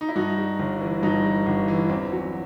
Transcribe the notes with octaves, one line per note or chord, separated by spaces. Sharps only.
D#4
E4
G2 D#4 F#4
G3
G1
E3
G2 D#4 F#4
G3
G1
E3
E2 C4
F#3